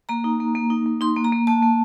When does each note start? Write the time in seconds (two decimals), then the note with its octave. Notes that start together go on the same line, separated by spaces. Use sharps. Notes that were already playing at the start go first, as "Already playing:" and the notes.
0.09 A#3 A#5
0.24 D#4
0.40 A#3
0.55 A#3
0.70 D#4
0.86 A#3
1.01 D#4 C6
1.16 A#3
1.24 A#5
1.32 A#3
1.47 A#3 A5
1.62 A#3